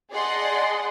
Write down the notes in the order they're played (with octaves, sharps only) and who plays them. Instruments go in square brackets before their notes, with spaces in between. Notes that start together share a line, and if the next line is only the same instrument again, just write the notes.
[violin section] G#4 D5 D#5 F#5 A5 C6